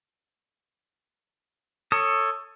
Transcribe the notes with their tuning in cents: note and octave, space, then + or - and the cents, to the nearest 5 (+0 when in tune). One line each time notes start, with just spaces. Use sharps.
A4 +15 C#5 +0 D#6 +0